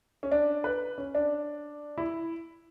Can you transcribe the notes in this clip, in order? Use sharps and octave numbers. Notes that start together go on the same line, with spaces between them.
C#4
D4
B4
C#4
D4
E4